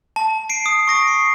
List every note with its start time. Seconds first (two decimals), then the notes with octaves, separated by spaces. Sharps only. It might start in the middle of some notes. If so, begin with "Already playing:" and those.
0.16 A5
0.49 C7 D7
0.66 D#6
0.88 C#6 A#6 D7
1.08 C7